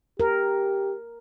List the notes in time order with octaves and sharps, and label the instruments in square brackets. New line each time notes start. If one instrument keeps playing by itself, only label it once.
[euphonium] G4 [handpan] A#4